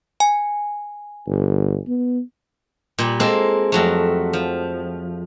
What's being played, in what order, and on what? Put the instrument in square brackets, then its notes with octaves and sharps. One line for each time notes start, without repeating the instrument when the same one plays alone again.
[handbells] G#5
[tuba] G1
B3
[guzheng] A#2 G3
G#3 A#3 C4 A4
F2 F#3 A3
F3